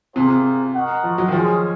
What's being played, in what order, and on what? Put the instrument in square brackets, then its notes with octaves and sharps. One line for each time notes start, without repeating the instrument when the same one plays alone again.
[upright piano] C3 [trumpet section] A#3 F4 G#4 C5
[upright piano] C3
[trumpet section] F#4 A#4 D#5 F#5
[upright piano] F3
F#3
D#3
[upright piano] F3 [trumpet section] G#3 C#4 G#4